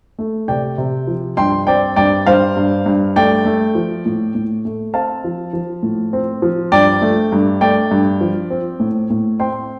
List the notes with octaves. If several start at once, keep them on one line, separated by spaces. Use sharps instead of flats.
A3
C3 D5 G5
C3
F3
G2 G5 C6
C4 D5 G5
G2 D5 G5
G2 C5 F5
G2
G2
A3 D5 G5
A3
F3
A2
A2
A3
C4 F5 A5
F3
F3
A2
C4
F3
G2 D5 G5
A3
G2
A3 D5 G5
G2
F3
C4
A2
A2
C4 G5 C6